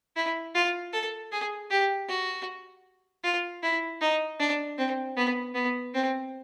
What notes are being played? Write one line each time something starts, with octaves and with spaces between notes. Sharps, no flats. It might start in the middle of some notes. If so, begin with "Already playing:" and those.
E4
F4
A4
G#4
G4
F#4
F4
E4
D#4
D4
C4
B3
B3
C4